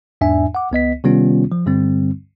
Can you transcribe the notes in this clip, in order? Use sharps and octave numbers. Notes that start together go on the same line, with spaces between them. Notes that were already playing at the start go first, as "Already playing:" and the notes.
E2 G#2 D4 E5 G#5
F#5 D6
C#2 B3 D#5 B6
C3 D#3 G3 B3 C#4 F4
F3
G2 D3 G3 C4